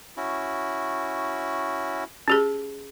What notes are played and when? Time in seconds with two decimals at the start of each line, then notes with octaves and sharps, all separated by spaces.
0.17 C#4 E4 F#4
2.28 C#4 G4 G#4